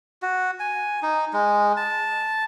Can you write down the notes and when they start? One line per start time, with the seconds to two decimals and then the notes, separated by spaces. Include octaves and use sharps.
0.22 F#4
0.60 G#5
1.03 D#4
1.33 G#3
1.77 A5